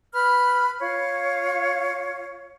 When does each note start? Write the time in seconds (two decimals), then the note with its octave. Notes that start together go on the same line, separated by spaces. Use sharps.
0.14 B4 B5 F6
0.79 F4 C#5